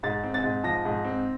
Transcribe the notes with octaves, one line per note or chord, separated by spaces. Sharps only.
G#2 A6
C4
A6
G#2
F3 A#6
G#2
C4